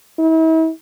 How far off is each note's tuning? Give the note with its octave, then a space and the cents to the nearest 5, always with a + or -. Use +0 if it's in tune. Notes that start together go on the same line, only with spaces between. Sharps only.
E4 -40